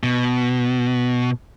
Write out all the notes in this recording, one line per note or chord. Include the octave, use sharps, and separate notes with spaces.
B2